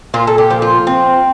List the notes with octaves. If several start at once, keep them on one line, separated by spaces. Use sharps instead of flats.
A#2 F4
A4
G4
F3
F4
C4